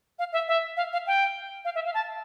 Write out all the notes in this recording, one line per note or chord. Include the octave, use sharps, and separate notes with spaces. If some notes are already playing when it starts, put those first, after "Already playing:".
F5
E5
E5
F5
F5
G5
F5
E5
F5
A5